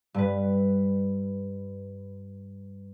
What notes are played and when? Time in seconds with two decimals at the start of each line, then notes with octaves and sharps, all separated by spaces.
0.14 G2 B4